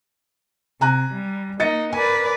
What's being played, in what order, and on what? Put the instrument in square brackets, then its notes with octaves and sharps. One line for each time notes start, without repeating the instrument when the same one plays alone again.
[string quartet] C3 [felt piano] G#5 A#5 F#6
[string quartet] G3
[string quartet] A#3 D#4 [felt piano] D#5 A6 C#7
[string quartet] A#4 B4 D5 [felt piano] G#5